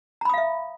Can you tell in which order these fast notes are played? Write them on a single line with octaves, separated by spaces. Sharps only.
A#5 B5 D#6 F5 E5